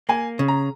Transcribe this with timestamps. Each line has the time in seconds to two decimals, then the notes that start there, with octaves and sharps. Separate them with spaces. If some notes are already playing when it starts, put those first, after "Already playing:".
0.09 A#3 G#5
0.39 C#3
0.48 A#5